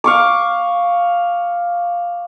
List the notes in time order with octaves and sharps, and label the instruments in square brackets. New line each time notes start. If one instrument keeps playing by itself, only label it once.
[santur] F5 C#6 D6